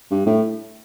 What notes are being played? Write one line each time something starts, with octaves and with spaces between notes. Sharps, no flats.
G2
A2